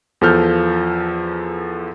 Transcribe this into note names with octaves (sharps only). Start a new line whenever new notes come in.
E2 F3 A4 F6 G6